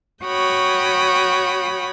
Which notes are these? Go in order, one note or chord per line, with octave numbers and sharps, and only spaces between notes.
F#4 C#5 G5 B5 D#6